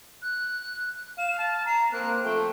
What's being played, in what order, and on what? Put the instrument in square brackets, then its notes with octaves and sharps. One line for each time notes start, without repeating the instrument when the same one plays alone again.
[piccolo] F#6
[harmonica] F5 [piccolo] E7
[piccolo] A5
[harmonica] A#5 [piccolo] C7
[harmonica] A#3 C4 [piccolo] F#6
[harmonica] F3 A3 [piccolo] G5